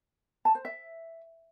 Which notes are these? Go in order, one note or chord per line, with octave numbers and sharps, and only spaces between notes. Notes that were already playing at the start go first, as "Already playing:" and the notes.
A5
C5
E5